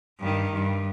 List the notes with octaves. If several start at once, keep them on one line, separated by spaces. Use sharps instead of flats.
G2 D#3
G2